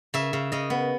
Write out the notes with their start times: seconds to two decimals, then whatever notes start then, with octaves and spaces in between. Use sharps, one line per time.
0.14 C#3 E5
0.33 C#3
0.52 C#3 D#5
0.70 B3